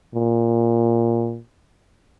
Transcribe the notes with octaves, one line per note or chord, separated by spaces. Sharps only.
A#2